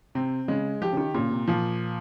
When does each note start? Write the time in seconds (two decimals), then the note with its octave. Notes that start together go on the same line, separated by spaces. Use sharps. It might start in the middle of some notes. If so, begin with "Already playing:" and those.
0.15 C3 C4
0.48 C#3 G#3
0.81 F3 G4
0.93 C#3
0.97 D#3
1.14 A#2 C#3
1.31 C3
1.48 A#2 F3